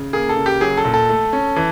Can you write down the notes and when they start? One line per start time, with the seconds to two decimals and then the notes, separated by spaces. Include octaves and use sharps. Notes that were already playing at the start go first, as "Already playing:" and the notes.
Already playing: C#3
0.13 A#3 G#4
0.29 A4
0.37 C#3
0.46 G4
0.61 F#3 G#4
0.78 A4
0.85 A#2
0.94 A4
1.09 A3
1.33 C#4
1.56 E3